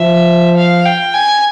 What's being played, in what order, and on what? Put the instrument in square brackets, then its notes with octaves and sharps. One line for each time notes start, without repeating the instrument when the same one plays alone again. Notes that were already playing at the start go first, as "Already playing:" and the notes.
Already playing: [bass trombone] F3 [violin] E5
[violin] F5
G5
G#5